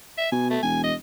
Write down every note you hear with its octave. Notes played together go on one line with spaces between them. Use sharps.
E5
B2 G#5
A3
E1 G#5
D#5